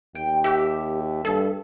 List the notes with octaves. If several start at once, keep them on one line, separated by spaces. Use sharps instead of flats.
D#2 G5
G4 E5
G2 A4